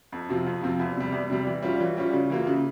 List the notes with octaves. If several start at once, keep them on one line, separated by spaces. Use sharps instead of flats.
F2
C3 F3 C4 F4
F2
C3 F3 C4 F4
E2
C3 G3
E2
C3 G3
E3
G3 C#4 F4
E3
G3 C#4 F4
C#3
E3 A#3 F4
C#3